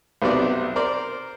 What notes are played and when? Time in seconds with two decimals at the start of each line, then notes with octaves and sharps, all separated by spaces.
0.22 B1 C3 B3 D5
0.76 A#4 C5 D5